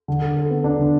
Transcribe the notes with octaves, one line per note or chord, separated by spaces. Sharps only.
D3
A4
A4
B3
D4
D3